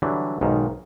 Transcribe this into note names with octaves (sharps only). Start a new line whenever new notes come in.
D3 E3 F#3 G3
B1 G#2 D#3